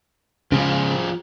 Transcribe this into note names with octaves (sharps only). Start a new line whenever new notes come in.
C#3 F3 G#3 F4 G#4